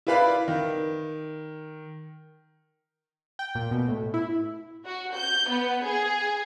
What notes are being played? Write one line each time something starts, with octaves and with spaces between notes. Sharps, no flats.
E4 F4 B4 D5 F5 B5
D#3
G5
A#2
B2
A2
E4
F#4
G6
B3
G#4